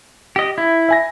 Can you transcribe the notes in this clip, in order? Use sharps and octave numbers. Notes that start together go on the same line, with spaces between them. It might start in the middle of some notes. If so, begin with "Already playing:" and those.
G4 D#5
E4
E5 G#5 A#6